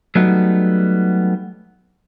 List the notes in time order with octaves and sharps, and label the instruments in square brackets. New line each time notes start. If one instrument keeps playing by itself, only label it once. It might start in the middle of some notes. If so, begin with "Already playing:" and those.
[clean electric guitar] F#3 G3 A3 B3 D#4